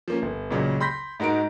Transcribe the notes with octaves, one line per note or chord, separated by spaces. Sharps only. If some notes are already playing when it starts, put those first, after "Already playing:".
F3 A#3 C#4
G1
C#2 A#2 C#3 F#3
B5 C6 G6 A#6 B6
G#2 D#4 F#4 A#4 D7